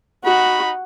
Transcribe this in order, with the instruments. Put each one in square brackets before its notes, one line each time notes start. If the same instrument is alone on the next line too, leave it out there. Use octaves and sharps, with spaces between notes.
[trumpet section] D#4 B5 [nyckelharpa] F#4